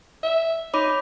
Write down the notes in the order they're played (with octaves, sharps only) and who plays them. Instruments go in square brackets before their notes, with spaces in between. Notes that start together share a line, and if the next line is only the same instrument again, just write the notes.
[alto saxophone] E5
[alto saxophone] D#4 [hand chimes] C#5 B5 D6